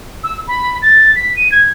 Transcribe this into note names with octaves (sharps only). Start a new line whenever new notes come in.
E6
B5
A6
B6
D#7
G#6